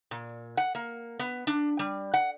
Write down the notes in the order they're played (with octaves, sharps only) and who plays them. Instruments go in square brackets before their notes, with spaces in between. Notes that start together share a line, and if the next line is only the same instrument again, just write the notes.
[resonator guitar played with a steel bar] A#2
F#5
A#3
B3
D4
G3
F#5